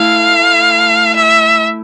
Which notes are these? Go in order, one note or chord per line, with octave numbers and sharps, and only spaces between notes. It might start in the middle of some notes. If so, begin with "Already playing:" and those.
Already playing: A3 E4 F5
E5